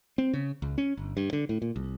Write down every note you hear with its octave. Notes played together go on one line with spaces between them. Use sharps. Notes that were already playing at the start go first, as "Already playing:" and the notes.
C4
C#3
C#2
C#4
G1
G2
D3
A2
A#2
C2